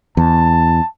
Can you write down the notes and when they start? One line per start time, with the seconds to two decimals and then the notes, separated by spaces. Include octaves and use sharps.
0.17 E2 A5